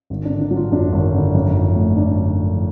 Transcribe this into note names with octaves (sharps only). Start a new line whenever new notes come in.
G#1
D3 D4
D4
F#3
F4
F#2 D4
G#1
D3
F#2
F3
A3
D3 D4
F#2
F3